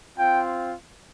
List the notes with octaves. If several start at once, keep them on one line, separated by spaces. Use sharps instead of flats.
C4 F4 G5